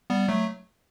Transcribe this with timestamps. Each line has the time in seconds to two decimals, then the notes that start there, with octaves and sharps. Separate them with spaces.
0.10 G3 B3
0.28 F#3 A3